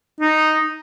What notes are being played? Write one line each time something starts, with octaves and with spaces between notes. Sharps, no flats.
D#4